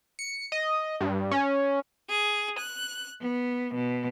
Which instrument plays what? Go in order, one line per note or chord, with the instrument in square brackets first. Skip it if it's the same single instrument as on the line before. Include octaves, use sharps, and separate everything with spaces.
[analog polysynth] C#7
D#5
G2
C#4
[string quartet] G#4
F#6
B3
B2